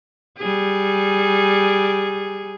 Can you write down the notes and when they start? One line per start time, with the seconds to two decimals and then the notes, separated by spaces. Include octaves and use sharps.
0.38 G3 G#4